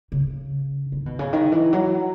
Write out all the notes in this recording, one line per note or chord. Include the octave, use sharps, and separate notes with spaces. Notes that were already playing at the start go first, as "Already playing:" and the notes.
C#3
D#3
B2
C#3
D#3
E3
F#3